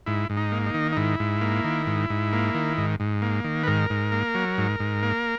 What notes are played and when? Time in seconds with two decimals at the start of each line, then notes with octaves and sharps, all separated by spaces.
0.06 G#2 E4
0.30 G#2
0.37 D#4
0.52 A#3
0.66 D#4
0.74 D#3
0.92 D#4
0.97 G#2 E4
1.20 G#2
1.41 A#3
1.64 D#3
1.87 G#2
2.10 G#2
2.33 A#3
2.55 D#3
2.78 G#2
3.00 G#2
3.22 A#3
3.44 D#3
3.63 B4
3.67 G#2 A#4
3.90 G#2
4.12 A#3
4.35 F#3
4.58 G#2
4.80 G#2
5.03 A#3